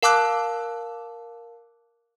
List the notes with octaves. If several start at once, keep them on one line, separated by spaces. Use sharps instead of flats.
A#4 F5 A5 D6 E6 F#6